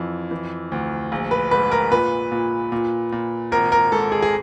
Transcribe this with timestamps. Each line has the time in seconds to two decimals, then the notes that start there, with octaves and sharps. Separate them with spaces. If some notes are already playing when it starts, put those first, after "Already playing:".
Already playing: F2 E3
0.31 E3
0.72 D2
1.12 A#1
1.31 B4
1.51 G#2 B4
1.71 A#4
1.91 A#2 B4
2.32 A#2
2.72 A#2
3.12 A#2
3.52 G#1 A#4
3.72 A#4
3.92 G#2 A4
4.12 G#4
4.22 G#4